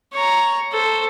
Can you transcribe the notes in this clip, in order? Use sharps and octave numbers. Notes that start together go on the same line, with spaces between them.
C#5 A#5
A4 C5